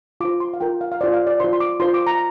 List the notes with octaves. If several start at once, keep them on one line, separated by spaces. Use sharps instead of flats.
F4 C5 D6
C6
F5
F4 A#4 G5
F5
F5
F4 C5 D5
F5
D5
F4 C5 C6
C6
D6
F4 C5 C6
D6
A#5